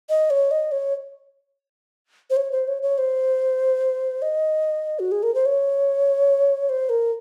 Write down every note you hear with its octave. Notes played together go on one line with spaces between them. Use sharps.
D#5
C#5
D#5
C#5
C5
C#5
C5
C#5
C#5
C5
D#5
F#4
G#4
A#4
C5
C#5
C5
A#4